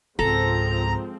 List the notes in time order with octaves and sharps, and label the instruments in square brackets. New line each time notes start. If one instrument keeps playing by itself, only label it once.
[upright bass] C#2 G#2 [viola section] F3 G#3 C4 [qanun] A4 [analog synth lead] A#5